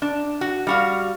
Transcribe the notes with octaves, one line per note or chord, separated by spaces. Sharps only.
D4
F#4
G3 F#4 F5